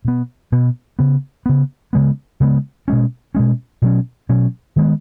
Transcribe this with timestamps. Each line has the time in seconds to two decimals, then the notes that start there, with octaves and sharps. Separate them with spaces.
0.05 B2 B3
0.52 B2 B3
0.99 C#3 B3
1.46 C#3 B3
1.93 C#3 G#3 B3
2.40 C#3 G#3 B3
2.88 B2 G#3 C#4
3.35 B2 G#3 C#4
3.82 B2 F#3 C#4
4.29 B2 F#3 C#4
4.76 D#3 G#3 B3